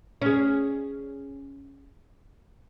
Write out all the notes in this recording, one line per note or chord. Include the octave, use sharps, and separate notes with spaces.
C#4 G#4